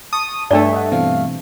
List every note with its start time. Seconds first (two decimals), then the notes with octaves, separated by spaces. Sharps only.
0.13 A5 C#6 D#6
0.51 G2 A3 D4 D5 E5
0.73 D#5 F#5
0.92 B2 E3 C4 F5